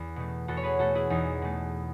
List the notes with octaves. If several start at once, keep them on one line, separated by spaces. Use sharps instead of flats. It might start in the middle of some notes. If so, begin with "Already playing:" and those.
Already playing: E2
B2 A3
E2 F#4 A4
C#5
G#4 B4
B2 A3 F#4 A4
E4 G#4
E2 D#4
B2 A3